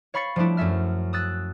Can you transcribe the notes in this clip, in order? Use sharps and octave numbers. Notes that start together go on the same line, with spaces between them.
C#5 F5 B5 C#6 A6 C#7
F3 G3 A3 D4 E4
F#2 A3 C#4 E5 F6
D#6 E6 F#6 A6